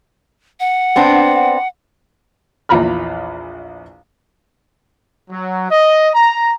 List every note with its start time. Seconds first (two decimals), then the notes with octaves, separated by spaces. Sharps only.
0.60 F#5
0.96 B3 C4 D4
2.69 A#1 E2 F4 A#5 B5 F6
5.30 F#3
5.70 D#5
6.14 A#5